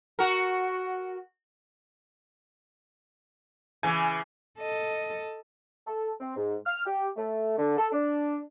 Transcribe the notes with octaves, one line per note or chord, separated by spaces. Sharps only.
F#4 A#4
C#3 E3 G#5
A4 D#5
A4
C4
G#2
F6
G4
A3
D3
A4
D4